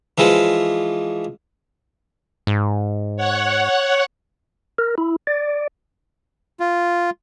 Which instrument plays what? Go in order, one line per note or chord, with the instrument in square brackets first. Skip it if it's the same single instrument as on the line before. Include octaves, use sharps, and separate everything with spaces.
[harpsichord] E3 F3 G#3
[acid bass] G#2
[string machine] C#5 F#5
[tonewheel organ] A#4
E4
D5
[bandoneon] F4